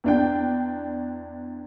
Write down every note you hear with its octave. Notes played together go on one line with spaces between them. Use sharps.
E2 D4 G5